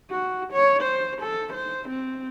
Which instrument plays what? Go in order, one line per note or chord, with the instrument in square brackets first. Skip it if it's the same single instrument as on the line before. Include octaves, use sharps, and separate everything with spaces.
[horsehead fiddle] F#4
C#5
C5
A4
C5
C4